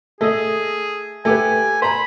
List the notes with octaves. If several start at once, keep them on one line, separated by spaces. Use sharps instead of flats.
A3 G#4 D#5
A3 G4 B4 G#5
C5 A#5 B5